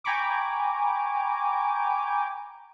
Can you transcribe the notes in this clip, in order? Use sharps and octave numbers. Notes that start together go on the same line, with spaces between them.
G5 G#5 A#5 B5 C#6 D6